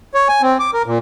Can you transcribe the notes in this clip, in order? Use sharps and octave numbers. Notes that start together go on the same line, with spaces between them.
C#5
G#5
C4
D6
A#4
A#2